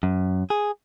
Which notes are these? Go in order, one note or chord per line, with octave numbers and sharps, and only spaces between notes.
F#2
G#4